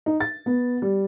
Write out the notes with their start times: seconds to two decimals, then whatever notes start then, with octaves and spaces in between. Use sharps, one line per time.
0.06 D#4
0.20 A6
0.46 B3
0.82 G3